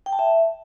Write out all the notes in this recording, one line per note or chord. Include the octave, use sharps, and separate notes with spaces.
G5
A5
E5